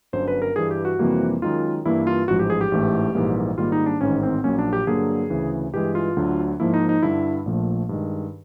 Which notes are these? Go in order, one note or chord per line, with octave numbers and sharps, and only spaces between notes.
G1 F#2 D3 C5
B4
A#4
G2 E3 G3 G#4
G4
F#4
F2 C3 E3 G3 A#3
F#2 D#3 G#3 F4
G2 E3 G3 A#3 E4
F4
A1 G#2 F3 G#3 F#4
G4
G#4
G4
A1 G#2 E3 A3
A#1 G#2 E3 G3 A#3
G#2 D#3 G3 A#3 F4
D#4
D4
A1 G#2 D#3 C#4
C4
A#1 A#2 F#3 A#3 C#4
D4
G4
G2 D3 F#3 A#3 G#4
D2 C#3 E3
G2 E3 G#3 G4
F4
D2 D3 F#3
G#2 F3 A#3 E4
D#4
D#4
G2 D3 G3 E4
A#1 A#2 F3 A3
G2 D#3 G#3